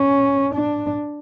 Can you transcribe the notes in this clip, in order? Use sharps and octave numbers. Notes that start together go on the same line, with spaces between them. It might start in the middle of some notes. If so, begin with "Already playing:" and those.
Already playing: C#4
D4